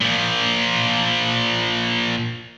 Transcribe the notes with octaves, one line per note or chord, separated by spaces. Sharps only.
A#2 F3